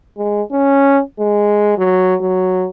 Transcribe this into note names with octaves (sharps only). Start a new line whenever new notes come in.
G#3
C#4
G#3
F#3
F#3